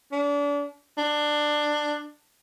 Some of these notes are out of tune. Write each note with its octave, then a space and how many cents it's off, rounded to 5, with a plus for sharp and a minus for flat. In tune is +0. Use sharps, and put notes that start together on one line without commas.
D4 -35
D4 +15